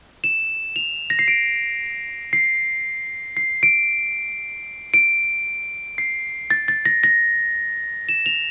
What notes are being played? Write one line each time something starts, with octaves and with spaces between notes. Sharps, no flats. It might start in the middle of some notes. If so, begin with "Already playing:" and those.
E7
F7
A#6
C7
D7
C7
C7
D7
D7
C7
A6
A6
A#6
A#6
E7
F7